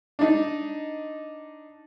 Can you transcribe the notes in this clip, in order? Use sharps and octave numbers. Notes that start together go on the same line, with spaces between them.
D4 D#4